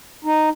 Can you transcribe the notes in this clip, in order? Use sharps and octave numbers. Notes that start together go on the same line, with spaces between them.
D#4